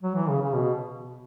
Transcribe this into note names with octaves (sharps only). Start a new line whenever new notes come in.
F#3
E3
C#3
C#3
B2